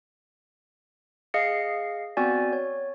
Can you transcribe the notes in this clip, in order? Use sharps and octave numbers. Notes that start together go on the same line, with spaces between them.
G#4 D#5 F5 C7 C#7
B3 C4 F#4 D5 G#5
C#5